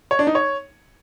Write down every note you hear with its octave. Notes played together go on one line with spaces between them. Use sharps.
C#5
D4
D#4
C#5